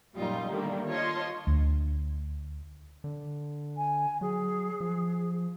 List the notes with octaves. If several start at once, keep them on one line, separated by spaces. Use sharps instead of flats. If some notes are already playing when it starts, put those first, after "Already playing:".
F#2 A#2 G3 D#4 F4
D3 D#3 G3 A3 A#3
F4 C#5 D#5 A5 C6
D2
D3
G#5
F#3 G#4
F3